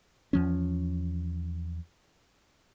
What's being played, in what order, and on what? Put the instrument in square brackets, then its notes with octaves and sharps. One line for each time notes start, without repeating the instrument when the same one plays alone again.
[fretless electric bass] E2 F3 C#4